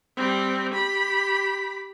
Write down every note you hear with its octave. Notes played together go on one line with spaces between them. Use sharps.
G3 C4
G4 B5